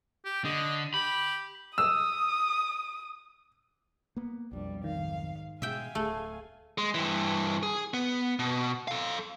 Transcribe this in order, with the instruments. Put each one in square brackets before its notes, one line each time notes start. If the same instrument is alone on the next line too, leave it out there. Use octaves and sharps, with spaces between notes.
[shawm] G4
[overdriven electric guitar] D3 [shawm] D#5
[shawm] G4 [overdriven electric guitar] B5
[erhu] D#6 [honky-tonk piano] E6
[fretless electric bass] A#3 B3
[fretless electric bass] B1 F2 [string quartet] G3 D4
[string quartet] G#2 F5 [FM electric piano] D#3
[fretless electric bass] B2 G#3 [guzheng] E5 G5 [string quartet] F5 G#5
[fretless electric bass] D1 [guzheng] A3
[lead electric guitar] G#3
G2 E3
G#4
B3
B2
A4 F5